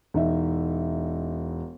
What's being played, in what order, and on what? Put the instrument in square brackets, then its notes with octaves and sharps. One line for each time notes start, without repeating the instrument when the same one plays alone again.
[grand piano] E1 D#4 D#5 E5